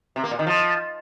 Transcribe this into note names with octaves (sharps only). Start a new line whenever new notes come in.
C3
A#3
A#2
D#3
F3